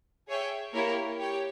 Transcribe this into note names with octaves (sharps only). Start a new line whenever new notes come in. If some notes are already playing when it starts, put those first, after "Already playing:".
G#4 C#5 E5 G5
A#3 E4 G4 A#4 C#5
G4 C#5 G5